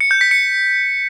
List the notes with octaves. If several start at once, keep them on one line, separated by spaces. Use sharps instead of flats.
C#7
G6
B6
C#7